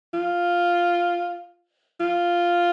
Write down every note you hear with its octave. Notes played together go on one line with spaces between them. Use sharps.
F4
F4